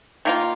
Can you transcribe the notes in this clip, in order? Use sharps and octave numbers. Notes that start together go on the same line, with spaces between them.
D#3 A#3 F4